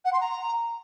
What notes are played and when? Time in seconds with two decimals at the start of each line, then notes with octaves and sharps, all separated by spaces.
0.05 F#5
0.13 C6
0.21 A#5